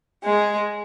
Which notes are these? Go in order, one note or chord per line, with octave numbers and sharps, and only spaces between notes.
G#3